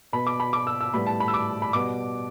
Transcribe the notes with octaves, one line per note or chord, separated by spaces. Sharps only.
B2 B3 B5
D6
B5
D6
E6
E6
A2 G3 B3 B5
A5
B5
E6
D6
B5
B2 G3 B3 D6